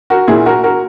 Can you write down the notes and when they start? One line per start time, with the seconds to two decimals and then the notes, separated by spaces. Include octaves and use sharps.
0.10 F#4 A#4
0.28 A#2 E4 G#4
0.46 F#4 A#4
0.63 F#4 A#4